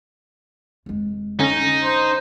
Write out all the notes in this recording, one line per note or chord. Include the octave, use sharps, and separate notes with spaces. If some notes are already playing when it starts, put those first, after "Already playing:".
F1 G#3
D3 C#4 D#4
C5